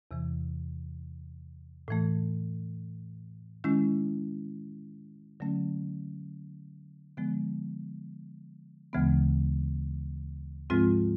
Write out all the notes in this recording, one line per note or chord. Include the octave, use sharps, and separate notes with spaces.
E2 C3 E3
A2 E3 A3
D#3 G#3 C#4 E4
D3 F#3 A3 C#4
D3 F3 G#3 B3
D2 C#3 E3 G#3 B3
G#2 F3 G#3 C4 F4